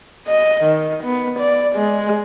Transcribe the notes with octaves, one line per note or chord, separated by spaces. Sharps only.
D#5
D#3
B3
D5
G#3